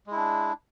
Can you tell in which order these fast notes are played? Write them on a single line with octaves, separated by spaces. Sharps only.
G#3 E4 D4